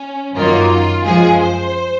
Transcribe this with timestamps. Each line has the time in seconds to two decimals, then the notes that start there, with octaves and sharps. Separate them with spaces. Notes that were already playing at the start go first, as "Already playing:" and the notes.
Already playing: C#4
0.35 F#2 D#3 F#3 A#3 F4
1.05 F#2 F3 G#3 G#4
1.41 C5